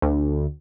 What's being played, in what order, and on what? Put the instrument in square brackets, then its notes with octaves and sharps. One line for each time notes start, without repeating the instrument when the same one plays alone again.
[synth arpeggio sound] D2